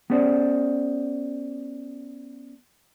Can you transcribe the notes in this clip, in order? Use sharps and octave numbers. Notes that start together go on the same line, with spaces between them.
B3 C#4 G#4 C5 D5